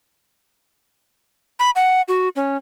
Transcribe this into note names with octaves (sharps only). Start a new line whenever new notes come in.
B5
F#5
F#4
C#4